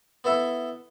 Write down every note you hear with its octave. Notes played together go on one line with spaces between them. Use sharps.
B3 E4 A4 E5